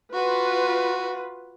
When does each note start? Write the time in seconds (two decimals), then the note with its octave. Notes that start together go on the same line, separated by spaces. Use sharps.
0.14 F4 F#4 B4